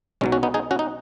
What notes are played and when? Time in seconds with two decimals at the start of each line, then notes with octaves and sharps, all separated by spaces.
0.21 B1 B2 F#3 G#3 C#4
0.32 C#4 F#4
0.43 B3 D#4
0.54 D#4 G#4
0.71 C#4 F#4
0.79 D#4